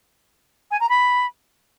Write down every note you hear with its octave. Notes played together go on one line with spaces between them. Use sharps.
G#5
A#5
B5